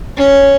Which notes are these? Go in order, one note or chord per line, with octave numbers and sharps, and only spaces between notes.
C#4